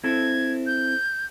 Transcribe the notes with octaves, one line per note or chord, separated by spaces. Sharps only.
C4 E4 A4 G#6
G6